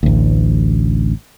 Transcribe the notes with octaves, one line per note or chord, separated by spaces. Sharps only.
A1 D2